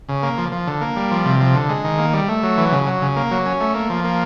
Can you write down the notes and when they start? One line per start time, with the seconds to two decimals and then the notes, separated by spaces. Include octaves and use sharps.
0.09 C#3
0.23 A#3
0.38 F3
0.52 F3
0.67 D3
0.81 A#3
0.96 G3
1.11 F3
1.25 C3
1.40 F3
1.55 D3
1.69 G#3
1.84 D#3
1.99 A#3
2.14 G3
2.29 A3
2.43 F#3
2.57 E3
2.72 C#3
2.87 F#3
3.02 C#3
3.16 A#3
3.31 F#3
3.46 C#4
3.60 A3
3.75 A#3
3.90 F3
4.04 A#3